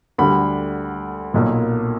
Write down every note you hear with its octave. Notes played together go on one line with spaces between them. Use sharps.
D2 D3 G3 B5
B1 A#2 A#3